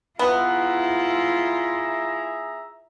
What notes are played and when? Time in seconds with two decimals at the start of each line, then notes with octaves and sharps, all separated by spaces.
0.19 B3 E4 F4 G#4 E5 A#5